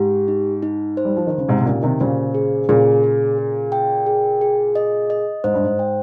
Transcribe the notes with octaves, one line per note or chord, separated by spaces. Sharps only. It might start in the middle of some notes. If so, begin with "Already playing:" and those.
Already playing: G#2 G4
D#4
D#4
C5
G3
F3
D#3
D#4
C#3
G#2 C3
C3
A#2 C#3 G4
C3 D#3
A#2 C#3 C5
G#4
A#2 C#3 G#4
G#4
G#4
G5
G#4
G#4
D#5
D#5
G#2 C5
G2
G#2
G5